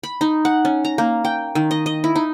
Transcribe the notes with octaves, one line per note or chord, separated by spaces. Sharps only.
B5
D#4
F#5
C#4
A#5
A#3
G5
D#3
D#5
D#5
E4
D#4